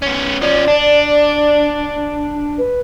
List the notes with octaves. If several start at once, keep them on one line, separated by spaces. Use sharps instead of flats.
B3 C#4
F3 C#4 D5
D4
B4